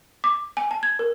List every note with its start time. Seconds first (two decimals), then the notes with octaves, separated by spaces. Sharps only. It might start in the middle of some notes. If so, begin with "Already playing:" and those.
0.24 D6
0.57 G#5
0.71 A5
0.83 G#6
0.99 A#4